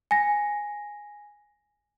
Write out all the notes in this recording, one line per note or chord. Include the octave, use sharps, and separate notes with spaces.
G#5 A#6